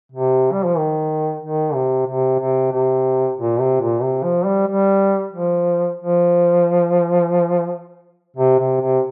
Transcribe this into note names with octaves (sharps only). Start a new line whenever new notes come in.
C3
G3
F3
D#3
D#3
C3
C3
C3
C3
A#2
C3
A#2
C3
F3
G3
G3
F3
F3
C3
C3
C3